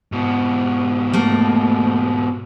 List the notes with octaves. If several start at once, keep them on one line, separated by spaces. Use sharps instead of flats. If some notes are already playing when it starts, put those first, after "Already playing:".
G#2 B2
A3 A#3